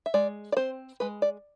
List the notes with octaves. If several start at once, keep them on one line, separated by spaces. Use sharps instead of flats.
E5
G#3 D5
D5
C4 C5
G#3 B4
D5